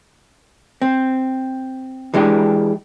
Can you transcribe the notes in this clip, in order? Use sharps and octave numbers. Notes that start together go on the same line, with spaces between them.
C4
E3 G#3 D4 G4